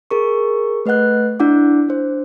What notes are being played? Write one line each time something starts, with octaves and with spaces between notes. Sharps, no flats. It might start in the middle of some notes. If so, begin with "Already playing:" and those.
G#4 A#4 C#6
A3 B4 D#5 F#5 F#6
D4 E4 F#5 D6
D4 C5